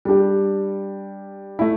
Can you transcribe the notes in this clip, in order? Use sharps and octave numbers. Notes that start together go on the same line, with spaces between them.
G3 D4 G4
A3 E4